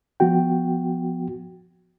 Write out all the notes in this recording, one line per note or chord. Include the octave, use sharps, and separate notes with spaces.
F3 B3 F#4 G5